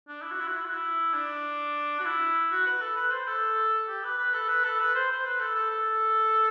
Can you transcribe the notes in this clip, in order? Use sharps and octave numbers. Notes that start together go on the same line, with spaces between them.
D4
E4
F#4
E4
F#4
E4
F#4
E4
D4
F#4
E4
F#4
B4
A4
B4
C5
A4
G4
B4
B4
A4
B4
A4
B4
C5
C5
B4
A4
A4
A4